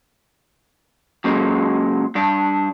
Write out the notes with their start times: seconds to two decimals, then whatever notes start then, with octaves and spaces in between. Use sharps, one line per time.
1.24 F#2 A#2 C#3 F#3 G#3
2.15 G2 D4